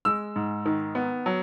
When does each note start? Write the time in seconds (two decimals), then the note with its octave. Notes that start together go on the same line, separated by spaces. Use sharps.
0.05 G#3 E6
0.36 G#2
0.66 D#3
0.95 B3
1.26 F#3